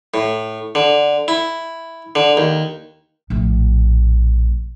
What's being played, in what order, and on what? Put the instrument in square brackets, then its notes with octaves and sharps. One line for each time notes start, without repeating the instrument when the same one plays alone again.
[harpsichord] A2
D3
E4
D3
D#2
[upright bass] A#1 A2